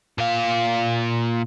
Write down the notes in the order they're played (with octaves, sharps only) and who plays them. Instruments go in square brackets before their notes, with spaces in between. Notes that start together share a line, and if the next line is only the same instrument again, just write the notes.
[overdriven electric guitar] A#2 F5